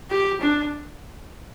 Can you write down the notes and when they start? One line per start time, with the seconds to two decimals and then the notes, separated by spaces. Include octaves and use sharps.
0.11 G4
0.41 D4